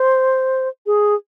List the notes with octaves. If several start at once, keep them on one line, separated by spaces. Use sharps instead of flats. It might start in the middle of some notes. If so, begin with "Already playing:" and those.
Already playing: C5
G#4